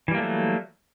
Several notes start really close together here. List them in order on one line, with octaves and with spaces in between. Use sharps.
E3 G3 A#3 A3 F#3